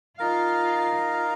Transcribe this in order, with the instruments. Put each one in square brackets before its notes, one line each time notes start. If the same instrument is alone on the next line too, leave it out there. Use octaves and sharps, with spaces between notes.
[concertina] D#4 A#4 F5 [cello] F4
[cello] F4